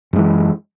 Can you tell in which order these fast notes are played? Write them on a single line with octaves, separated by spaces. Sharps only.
F#2 G#3 E3